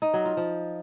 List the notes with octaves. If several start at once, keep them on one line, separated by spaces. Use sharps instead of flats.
D#4
F#3
F4
F3